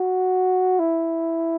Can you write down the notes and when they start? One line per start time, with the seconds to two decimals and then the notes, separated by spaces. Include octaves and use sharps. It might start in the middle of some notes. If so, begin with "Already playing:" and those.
Already playing: F#4
0.79 E4